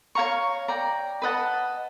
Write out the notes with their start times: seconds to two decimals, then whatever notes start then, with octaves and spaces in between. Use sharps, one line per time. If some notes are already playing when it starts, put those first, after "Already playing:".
0.15 C#5 F5 A#5 C#6
0.68 D5 G5 A#5
1.22 B4 D#5 F#5 A5